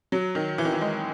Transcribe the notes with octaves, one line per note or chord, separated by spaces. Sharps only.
F#3
D#3
E3
D#3
E3
G#3